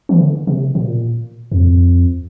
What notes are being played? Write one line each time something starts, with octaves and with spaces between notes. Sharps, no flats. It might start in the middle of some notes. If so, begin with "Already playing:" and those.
E3
D3
C3
A#2
E2
F2